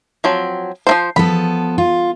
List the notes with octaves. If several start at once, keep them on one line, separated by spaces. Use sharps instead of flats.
F3 F#3 C4
F3 A#3 C5
F3 B3 A4 B5
F4